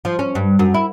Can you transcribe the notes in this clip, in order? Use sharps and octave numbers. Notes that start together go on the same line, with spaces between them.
F3
C#4
G2
F#2
E4